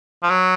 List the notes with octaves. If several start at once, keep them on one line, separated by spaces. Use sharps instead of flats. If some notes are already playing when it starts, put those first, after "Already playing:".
F3
F#3